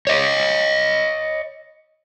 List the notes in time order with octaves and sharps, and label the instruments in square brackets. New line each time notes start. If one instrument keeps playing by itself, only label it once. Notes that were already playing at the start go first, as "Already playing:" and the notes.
[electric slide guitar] C#5 D#5